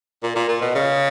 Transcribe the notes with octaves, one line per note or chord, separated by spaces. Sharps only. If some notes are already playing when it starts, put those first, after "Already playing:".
A#2
A#2
A#2
B2
C#3